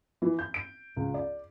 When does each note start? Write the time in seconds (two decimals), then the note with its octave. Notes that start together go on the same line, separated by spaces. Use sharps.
0.22 E3
0.39 G6
0.54 D7
0.96 C#2
1.14 D5